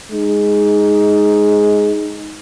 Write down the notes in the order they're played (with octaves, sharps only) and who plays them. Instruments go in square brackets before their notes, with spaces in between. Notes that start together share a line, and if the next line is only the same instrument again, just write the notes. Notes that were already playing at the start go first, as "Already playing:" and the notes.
[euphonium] G#3 [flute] D#4